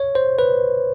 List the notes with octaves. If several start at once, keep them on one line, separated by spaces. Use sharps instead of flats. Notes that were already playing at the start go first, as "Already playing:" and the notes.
Already playing: C#5
C5
B4